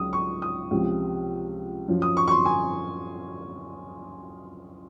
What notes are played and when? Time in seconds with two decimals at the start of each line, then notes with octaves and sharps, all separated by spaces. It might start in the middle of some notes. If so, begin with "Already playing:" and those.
Already playing: C#2 C#3 F#3 D#6
0.13 C#6
0.42 D#6
0.71 C#2 C3 F3
1.88 F#2 F3
2.02 D#6
2.17 C#6
2.28 C#6
2.31 C6
2.45 G#5